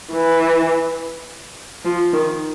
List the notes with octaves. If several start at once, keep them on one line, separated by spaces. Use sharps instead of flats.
E3
F3
D#3